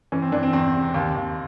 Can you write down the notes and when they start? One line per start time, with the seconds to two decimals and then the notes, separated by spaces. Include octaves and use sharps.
0.12 E3 C#4
0.22 C4
0.32 E3 D4
0.43 C4
0.53 E2 C4
0.74 C3
0.94 D#2
1.15 D#2